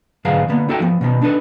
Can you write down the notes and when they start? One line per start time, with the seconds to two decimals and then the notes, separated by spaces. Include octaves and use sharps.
0.25 G#2 D3 F#3 G#4 B4 F5
0.48 D3 A#3 B3
0.69 D#4 F#4 A4 E5 G5
0.80 F3 B3
1.01 B2 D#3 B3
1.21 D4 D#4 A4 B4